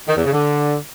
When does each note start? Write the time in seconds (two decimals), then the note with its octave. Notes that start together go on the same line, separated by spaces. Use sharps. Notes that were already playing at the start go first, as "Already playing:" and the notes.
0.08 D#3
0.16 E2
0.24 C#3
0.32 D3